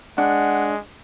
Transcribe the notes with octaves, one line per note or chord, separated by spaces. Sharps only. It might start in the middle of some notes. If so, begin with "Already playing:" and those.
G#3 D4 F#5